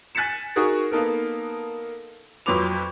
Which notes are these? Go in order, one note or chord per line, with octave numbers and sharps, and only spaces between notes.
G#5 F#6 A6 B6 C#7 E7
D#4 F#4 G#4 A#4
A#3 B3 D#4 A4 A#4
F2 F#3 B4 C6 D6 F7